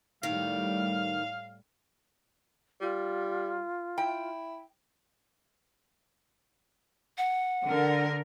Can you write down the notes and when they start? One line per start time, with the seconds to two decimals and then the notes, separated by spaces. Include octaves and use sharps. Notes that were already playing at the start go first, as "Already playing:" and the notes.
0.23 A2 D#3 G3 F5
2.81 G3 F4
3.98 E4 G5
7.18 F#5
7.66 D3 A#4